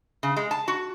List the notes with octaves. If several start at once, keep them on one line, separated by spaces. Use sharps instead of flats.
C#3
G#3
A5
F#4